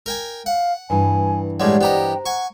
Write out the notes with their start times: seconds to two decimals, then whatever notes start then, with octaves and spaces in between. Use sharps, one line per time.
0.06 A#4 G5 G#5
0.46 F5 F#5
0.90 G2 E3 G#5
1.60 A2 G3 G#3 G4 C#5 D5 F#5
1.81 B3 G4 C5 D#5 G5 A#5
2.26 F#5 G#5 C#6